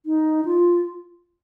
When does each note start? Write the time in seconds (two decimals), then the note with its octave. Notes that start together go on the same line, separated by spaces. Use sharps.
0.06 D#4
0.45 F4